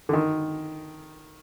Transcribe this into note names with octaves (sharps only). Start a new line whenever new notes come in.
D3
D#3